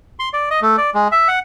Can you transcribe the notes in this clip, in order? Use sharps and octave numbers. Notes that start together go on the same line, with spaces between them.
C6
D5
D#5
A3
D5
G#3
E5
F#5